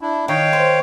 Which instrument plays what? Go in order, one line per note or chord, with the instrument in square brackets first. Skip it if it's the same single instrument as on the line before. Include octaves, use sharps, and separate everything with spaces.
[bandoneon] D4 E4
[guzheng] D#3 [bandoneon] C#5 F5 G5
[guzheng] C5